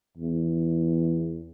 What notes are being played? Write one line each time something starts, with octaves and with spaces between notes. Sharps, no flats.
E2